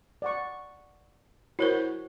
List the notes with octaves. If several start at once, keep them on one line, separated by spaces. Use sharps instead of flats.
D5 F#5 C#6
E4 F#4 A#4 C5 C#5